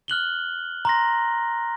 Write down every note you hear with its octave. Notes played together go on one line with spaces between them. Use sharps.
F6 F#6 F#7 G7
A#5 C6 A#6